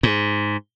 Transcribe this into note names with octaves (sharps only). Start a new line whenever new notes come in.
G#2